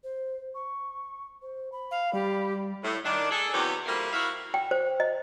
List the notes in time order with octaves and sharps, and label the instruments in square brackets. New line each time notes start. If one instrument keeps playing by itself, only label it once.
[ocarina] C5
C#6
C5
B5
[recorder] F5
[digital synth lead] G3 [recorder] G4
[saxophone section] A2
D#3 D4
G#4 A4
E2 C3 F#3 B3 F#4 G4
F3 G3 A3 A#3
E4 F#4 E5 F5
[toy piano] G5
C5
D#5